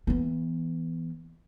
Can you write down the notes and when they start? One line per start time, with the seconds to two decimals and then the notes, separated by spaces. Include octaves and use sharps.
0.07 E3 B3